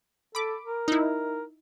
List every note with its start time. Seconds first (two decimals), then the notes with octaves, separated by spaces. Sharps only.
0.35 A4 B5 D6
0.65 A#4
0.88 D#4 E4